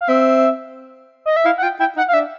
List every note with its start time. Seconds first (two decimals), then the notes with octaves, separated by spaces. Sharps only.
0.01 F5
0.08 C4 E5
1.26 D#5
1.36 E5
1.45 E4 F5
1.58 F#5
1.63 F4 G5
1.79 E4 G5
1.96 D#4 F#5
2.08 F5
2.14 D4 E5